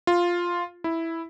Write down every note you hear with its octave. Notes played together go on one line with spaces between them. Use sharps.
F4
E4